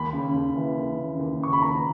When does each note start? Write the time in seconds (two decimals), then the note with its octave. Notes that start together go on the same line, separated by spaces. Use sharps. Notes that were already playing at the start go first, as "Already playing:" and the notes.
Already playing: D#2 B5
0.13 C#3
0.35 D#2
0.56 E3
0.76 D#2
0.98 C#3
1.19 D#2
1.40 C#3 C#6
1.53 B5
1.61 D#2 A#5